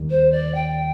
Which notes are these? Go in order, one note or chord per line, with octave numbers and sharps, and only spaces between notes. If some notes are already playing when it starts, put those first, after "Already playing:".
Already playing: D#2 D#3 G3
C5
D5
G5